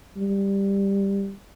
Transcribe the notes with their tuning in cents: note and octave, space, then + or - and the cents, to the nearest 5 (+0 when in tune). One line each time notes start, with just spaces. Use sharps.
G3 +10